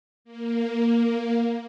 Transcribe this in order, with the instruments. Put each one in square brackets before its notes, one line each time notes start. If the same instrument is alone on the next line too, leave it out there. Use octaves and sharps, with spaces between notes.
[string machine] A#3